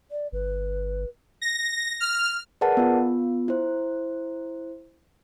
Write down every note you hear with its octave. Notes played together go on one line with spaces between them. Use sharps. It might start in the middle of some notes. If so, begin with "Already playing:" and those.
D5
G1 B4
A#6
F6
G#4 A#4 B4 D5 F#5 A5
B3 F4
E4 C5